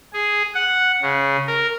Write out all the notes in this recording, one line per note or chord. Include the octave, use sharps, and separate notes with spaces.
G#4
F#5
C#3
A#4